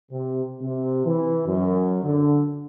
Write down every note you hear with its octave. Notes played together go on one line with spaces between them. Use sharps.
C3
C3
E3
F#2
D3